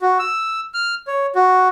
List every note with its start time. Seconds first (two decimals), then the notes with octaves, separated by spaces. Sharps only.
0.02 F#4
0.19 E6
0.74 F6
1.07 C#5
1.35 F#4